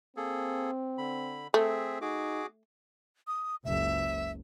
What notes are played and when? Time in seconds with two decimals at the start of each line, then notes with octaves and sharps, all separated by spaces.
0.17 A#3 C4 G#4 A4
0.98 D3 B5
1.54 A3 C4 G#4 E5
2.02 D#4 F#4 G#4 D6
3.27 D#6
3.65 F#1 C#2 E5